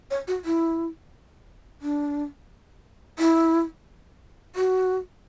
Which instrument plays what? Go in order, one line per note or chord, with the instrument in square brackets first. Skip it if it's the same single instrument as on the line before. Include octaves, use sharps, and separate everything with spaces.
[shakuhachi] C#5
F#4
E4
D4
E4
F#4